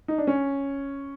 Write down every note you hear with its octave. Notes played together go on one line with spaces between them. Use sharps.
D#4
D4
C#4